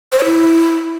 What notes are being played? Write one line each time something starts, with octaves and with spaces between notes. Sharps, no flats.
C5
C#5
E4